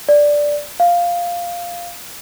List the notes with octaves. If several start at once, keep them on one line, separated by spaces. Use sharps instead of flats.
D5
F5